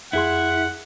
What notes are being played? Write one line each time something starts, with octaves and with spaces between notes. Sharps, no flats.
F2 E4 G#4 F#5 C6